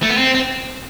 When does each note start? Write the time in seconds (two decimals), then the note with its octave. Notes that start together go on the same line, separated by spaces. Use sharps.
0.02 A3
0.10 B3
0.17 C4
0.35 C4